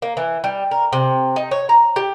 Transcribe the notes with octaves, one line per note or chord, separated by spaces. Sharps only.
A#3
E3
G3
A#4
C3
D#4
C#5
A#5
G4